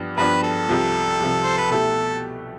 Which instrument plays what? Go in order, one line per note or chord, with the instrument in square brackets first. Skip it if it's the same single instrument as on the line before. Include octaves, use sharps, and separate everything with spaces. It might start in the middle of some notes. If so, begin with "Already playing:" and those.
Already playing: [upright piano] G2 F3 B3 D4
[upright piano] G2 F3 B3 D4 [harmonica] B4
[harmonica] A4
[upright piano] C2 C3 F3
C2 C3 F3
[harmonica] C5
B4
[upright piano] B2 A3 E4 G4 [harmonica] A4